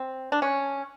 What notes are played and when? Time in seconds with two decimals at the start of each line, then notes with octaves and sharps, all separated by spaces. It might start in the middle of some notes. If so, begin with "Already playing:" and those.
Already playing: C4
0.32 D4
0.42 C#4